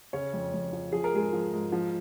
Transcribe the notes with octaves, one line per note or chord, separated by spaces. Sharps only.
C#3 C#4 C#5
F2
F2
F3
F3 G#4
A#4
G#2 G#3 G#4
F3
G#2
F3